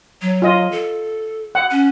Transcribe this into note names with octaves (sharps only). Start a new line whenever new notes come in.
F#3
F4 D#5
A4
F#5
C#4